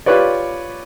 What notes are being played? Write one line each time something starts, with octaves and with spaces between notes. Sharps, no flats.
F4 G4 B4 C#5 D5